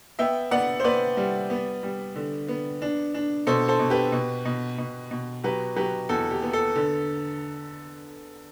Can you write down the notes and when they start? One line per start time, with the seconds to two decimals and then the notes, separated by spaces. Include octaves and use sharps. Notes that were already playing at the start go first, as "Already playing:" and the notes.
0.19 B3 E5 G5
0.51 B3 D5 F#5
0.80 C5
0.84 B3 B4 D5
1.17 G3
1.50 B3
1.83 G3
2.16 D3
2.48 B3
2.82 D4
3.14 D4
3.47 B2 A4 C5
3.68 A4 C5
3.79 B2
3.90 G4 B4
4.12 B2
4.45 B2
4.78 B2
5.11 B2
5.44 F#3 G4 B4
5.76 F#3 G4 B4
6.09 E2 A4
6.31 G4
6.43 B3
6.53 A4
6.76 D3